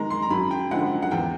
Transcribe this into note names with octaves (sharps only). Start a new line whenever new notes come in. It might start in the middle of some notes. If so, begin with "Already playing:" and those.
Already playing: D#3 G#3 A#5
C6
A#5
F#2 B5
G5
D3 F3 G#3 F#5
F#5
E2 G5